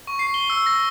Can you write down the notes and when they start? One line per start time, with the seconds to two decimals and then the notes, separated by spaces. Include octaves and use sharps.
0.07 C#6
0.19 C7
0.34 G7
0.50 E6
0.66 A#6